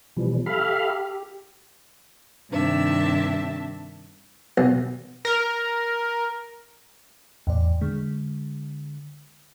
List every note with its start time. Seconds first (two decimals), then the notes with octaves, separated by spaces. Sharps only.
0.17 B2 E3 F3 G3
0.46 G4 A4 E5 F5 B5 F6
0.91 G4
2.51 G2 C3 D#3 D4 E5 A5
4.58 B1
5.25 A#4
7.47 E2 A2 D5
7.81 D3 G#3